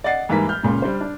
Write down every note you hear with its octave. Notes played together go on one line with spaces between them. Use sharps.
D5 D#5 F#5 A6 C7
G#2 E3 G3 A#3 A#5 B6
F6 G6
C#2 A#2 C#3
G3 D4 C5
D4